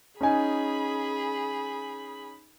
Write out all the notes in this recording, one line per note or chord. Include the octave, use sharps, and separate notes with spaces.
C#4 D#4 G#4 G#5 B5